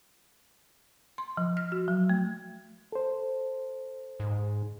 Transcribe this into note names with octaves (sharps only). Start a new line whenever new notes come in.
C6
F3
F6
F#4
F#3
A3
A4 C5
G#2